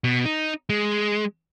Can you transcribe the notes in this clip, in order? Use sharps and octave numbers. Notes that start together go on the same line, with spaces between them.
B2
D#4
G#3